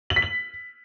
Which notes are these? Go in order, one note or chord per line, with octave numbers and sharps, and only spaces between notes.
F#7
B6
F#7